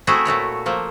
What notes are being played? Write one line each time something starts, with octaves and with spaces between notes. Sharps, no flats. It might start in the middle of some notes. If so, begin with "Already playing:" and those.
A3 C4 E4 F#4 G#4
A#2 A3 F#4 C#5
F3 A3 A#3